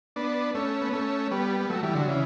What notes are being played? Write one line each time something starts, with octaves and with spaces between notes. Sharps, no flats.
B3 D4
A3 C#4
B3
A3 C#4
G3 B3
B3
F#3 A3
E3 G3
D3 F#3
C#3 E3